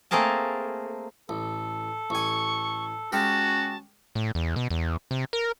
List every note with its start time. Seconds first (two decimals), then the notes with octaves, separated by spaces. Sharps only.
0.11 A3 A#3 C4 G#4 A#4 A5
1.29 A1 A4
2.10 A1 G#5 C#6
3.12 G#3 C#4 F#4 G4 A#4 A5
4.15 A2
4.35 E2
4.56 B2
4.71 E2
5.11 C3
5.33 A#4